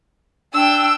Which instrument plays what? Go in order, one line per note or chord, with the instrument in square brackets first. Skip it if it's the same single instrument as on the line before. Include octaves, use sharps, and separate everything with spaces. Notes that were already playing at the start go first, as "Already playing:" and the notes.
[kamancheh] D4 G5 [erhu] E6